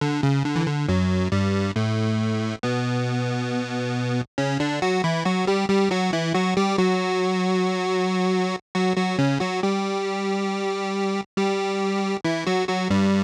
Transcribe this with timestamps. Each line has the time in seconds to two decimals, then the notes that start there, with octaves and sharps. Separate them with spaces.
0.01 D3
0.23 C#3
0.45 D3
0.56 E3
0.67 D3
0.89 F#2 F#3
1.32 G2 G3
1.76 A2 A3
2.63 B2 B3
4.38 C#3 C#4
4.60 D3 D4
4.82 F#3 F#4
5.04 E3 E4
5.25 F#3 F#4
5.47 G3 G4
5.69 G3 G4
5.91 F#3 F#4
6.13 E3 E4
6.34 F#3 F#4
6.57 G3 G4
6.78 F#3 F#4
8.75 F#3 F#4
8.97 F#3 F#4
9.19 C#3 C#4
9.40 F#3 F#4
9.63 G3 G4
11.37 G3 G4
12.24 E3 E4
12.47 F#3 F#4
12.68 F#3 F#4
12.90 G2 G3